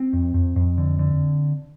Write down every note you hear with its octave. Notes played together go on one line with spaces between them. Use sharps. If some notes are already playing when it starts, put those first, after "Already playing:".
Already playing: C4
F2
F2
F2
D3
D3